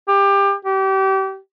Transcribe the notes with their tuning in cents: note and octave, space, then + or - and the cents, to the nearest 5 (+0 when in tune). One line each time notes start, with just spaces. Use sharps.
G4 +25
G4 -30